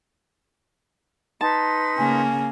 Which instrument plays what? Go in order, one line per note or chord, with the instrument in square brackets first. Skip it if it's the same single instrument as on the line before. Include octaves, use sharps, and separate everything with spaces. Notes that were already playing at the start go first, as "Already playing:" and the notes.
[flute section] D#4 B4 C6 [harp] A5
[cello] C#3 A#3 [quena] G#5